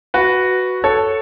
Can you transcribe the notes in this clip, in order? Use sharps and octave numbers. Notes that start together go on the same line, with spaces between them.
F#4 B4
A4 C#5